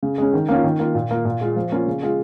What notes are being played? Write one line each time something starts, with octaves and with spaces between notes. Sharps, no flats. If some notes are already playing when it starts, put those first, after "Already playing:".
C#3
G#3 C#4
D#3
A#3 C#4 F4
D#3
A#3 F4
A#2
A#3 F4
A#2
G#3 F4
F3
A#3 C#4 F4
C#3
G#3 F4